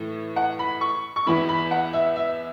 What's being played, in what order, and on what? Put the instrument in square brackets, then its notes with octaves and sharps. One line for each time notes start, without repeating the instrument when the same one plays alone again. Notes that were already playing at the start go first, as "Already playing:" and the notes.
Already playing: [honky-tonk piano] A2 E3 A3
F#5
B5
C#6
C#6
E2 E3 B3 E4 B5
B5
F#5
E5
E5